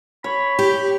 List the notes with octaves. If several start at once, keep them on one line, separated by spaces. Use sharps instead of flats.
C#5 B5
G4